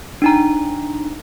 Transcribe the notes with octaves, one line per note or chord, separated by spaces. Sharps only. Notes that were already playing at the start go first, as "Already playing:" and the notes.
D4 D#4 A#5